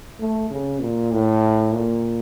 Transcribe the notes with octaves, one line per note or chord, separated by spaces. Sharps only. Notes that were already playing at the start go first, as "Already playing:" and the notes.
A3
C#3
A#2
A2
A#2